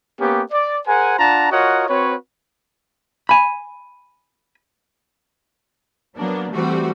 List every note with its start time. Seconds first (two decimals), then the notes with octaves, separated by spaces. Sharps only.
0.20 A#3 B3 C#4 G4
0.52 D5
0.87 G#4 A#4 C5 F#5 G#5
1.18 D4 F4 F#5 A5 A#5
1.51 F4 F#4 A#4 C#5 D#5 F#5
1.88 C4 F#4 B4 C#5
3.29 G#5 B5
6.17 F#3 A#3 B3 D4
6.51 E3 G3 A3 C4 F#4